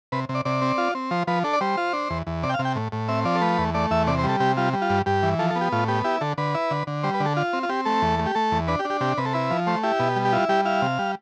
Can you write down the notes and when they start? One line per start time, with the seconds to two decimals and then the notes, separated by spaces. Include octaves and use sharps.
0.12 C3 B4
0.29 C3
0.35 D5
0.45 C3 D5
0.62 C4
0.78 F4
0.95 C4
1.11 F3 C5
1.27 F3 B4
1.44 D4 A4
1.53 D5
1.61 G3 C5
1.77 F4
1.93 D4
2.10 E2
2.27 E2
2.43 C3 D5
2.49 G5
2.54 F5
2.59 C3
2.65 G5
2.76 A2
2.92 A2
3.08 C4 E5
3.25 F3 D5
3.35 A4
3.41 A3 B4
3.58 E2
3.74 A3 D5
3.91 E2 E5
4.07 C3 D5
4.18 C5
4.24 G3
4.29 A4
4.40 C3 G4
4.57 G3 F4
4.73 G3
4.82 F4
4.90 G2
5.06 G2 G4
5.23 E3
5.39 F3 A4
5.50 A4
5.55 B3
5.61 G4
5.72 A2 F4
5.88 B3 G4
6.04 E4 G4
6.21 D3 A4
6.38 D3 B4
6.55 E4
6.71 D3
6.87 D3
7.03 G3 C5
7.14 B4
7.20 D3
7.26 A4
7.37 F4
7.53 C4
7.63 F4
7.69 C4 G4
7.85 A3 A4
8.02 E2
8.19 A3
8.26 G4
8.35 A3 A4
8.52 E2
8.68 D4 B4
8.79 G4
8.85 D4
8.90 G4
9.01 C3 G4
9.18 C3 B4
9.25 A4
9.33 E4 B4
9.50 F3
9.67 A3 C5
9.83 E4 G4
10.00 B2
10.16 G3
10.25 G4
10.33 E4 F4
10.49 G3 G4
10.65 E4 F5
10.82 C3
10.99 G3